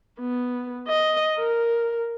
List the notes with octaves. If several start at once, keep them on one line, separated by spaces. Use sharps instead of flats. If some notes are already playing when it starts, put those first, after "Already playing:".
B3
D#5
A#4